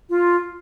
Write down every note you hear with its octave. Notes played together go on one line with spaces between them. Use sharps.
F4